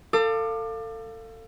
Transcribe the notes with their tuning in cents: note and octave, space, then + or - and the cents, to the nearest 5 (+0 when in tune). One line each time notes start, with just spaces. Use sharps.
A4 +30 F5 +0 D6 +30